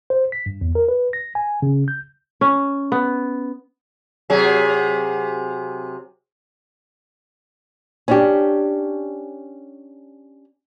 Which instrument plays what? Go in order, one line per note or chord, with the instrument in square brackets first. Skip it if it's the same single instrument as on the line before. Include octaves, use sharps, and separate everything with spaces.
[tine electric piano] C5
B6
G2
E2
A#4
B4
A#6
G#5
C#3
G6
[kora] C#4
B3
[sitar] C3 F#3 G#4
[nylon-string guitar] C#4 D4 G4